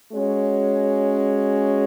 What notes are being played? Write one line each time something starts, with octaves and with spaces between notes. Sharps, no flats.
G#3 C#4 F#4 C#5